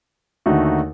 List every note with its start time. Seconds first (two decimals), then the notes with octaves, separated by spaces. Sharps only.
0.46 D#2 D3 A3 D#4 F#4